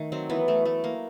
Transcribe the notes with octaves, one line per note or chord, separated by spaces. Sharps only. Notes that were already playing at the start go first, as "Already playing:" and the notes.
Already playing: D#3 A3
F#3 C4
E3 B3
A3
A3
A#3